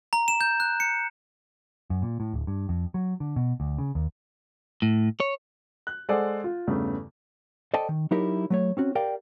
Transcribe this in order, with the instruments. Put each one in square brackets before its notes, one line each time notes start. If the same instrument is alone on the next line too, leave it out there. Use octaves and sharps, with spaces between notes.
[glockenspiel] A#5
E7
G6
F#6
C#7
[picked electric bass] F#2
A#2
A2
D1
G2
F2
F#3
D3
B2
D2
C#3
D#2
[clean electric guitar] A2
C#5
[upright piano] F#6
G#3 G#4 A4 C5 D5 F#5
F4
E2 G2 C#3 A3
[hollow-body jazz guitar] A4 C5 D5 D#5 G5 A5
D#3
F#3 D#4 E4 G4 A#4
F#3 A3 C#5
C4 C#4 F#4
G4 A#4 D5 F5 G5